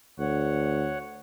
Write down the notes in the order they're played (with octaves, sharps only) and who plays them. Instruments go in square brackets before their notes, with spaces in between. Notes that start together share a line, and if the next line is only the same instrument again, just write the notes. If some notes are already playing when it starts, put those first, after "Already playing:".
[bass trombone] D2 [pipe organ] C#5 F#5